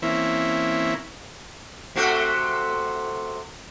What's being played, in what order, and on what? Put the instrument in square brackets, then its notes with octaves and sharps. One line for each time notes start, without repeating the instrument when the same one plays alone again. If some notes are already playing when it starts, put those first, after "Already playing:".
[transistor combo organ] E3 A#3 C4 C#4 E4
[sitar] C3 A3 F#4